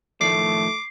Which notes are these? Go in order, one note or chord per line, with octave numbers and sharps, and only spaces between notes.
A2 D#3 F3 A3 D6 C7